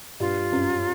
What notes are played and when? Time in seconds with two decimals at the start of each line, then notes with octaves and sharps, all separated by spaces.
0.20 G2 F4
0.52 F#2